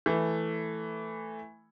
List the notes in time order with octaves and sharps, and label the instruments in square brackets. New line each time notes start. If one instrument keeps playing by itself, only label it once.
[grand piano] E3 A3